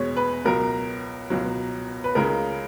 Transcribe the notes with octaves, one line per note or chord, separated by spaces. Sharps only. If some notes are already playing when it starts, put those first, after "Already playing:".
Already playing: E2 B2 G#3 C#5
B4
C#2 B2 F#3 A#4
C#2 B2 F#3
B4
C#2 C#3 G#3 A#4